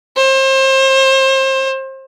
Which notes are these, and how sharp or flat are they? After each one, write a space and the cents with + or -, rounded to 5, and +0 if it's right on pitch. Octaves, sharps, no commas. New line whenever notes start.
C5 +35